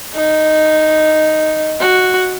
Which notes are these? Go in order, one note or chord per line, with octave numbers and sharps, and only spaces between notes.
D#4
F#4